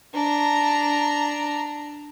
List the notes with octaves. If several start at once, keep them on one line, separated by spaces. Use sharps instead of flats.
D4 A#5